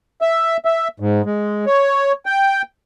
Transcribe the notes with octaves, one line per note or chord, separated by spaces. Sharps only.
E5
E5
G#2
G#3
C#5
G5